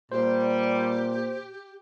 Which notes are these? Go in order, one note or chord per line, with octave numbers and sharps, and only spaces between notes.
A#2 G3 G4 C5